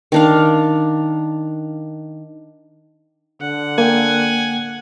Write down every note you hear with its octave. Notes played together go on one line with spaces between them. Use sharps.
D#3 D4 F5
D3 F#5
A#3 G5 G#5